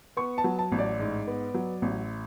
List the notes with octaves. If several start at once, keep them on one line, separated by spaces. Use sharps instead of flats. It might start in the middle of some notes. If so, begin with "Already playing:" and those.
B3 C#6
A5
F#3
A5
A1
D5
G#2
B3
F#3
A1